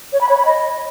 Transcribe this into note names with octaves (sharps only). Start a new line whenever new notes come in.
C#5
B5
C#5
B5
D#5